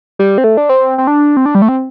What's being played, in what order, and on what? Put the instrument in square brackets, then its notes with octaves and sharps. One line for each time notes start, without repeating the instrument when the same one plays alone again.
[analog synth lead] G3
C4
A3
D4
C4
C4
D4
C4
D4
G3
A3
C4